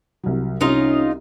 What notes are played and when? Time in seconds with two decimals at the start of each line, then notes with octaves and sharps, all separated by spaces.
0.24 C2 F#3
0.61 C2 C#4 D#4 F4 D#5 D#6